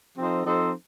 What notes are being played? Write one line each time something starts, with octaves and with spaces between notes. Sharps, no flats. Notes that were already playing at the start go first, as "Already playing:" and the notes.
F3 C4 D#4 A4 C5
F3 C4 D#4 A4 C5